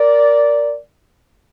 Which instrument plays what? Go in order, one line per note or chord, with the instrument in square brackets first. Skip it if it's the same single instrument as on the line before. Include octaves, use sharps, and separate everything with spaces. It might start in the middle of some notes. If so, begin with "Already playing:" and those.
Already playing: [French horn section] A#4 D5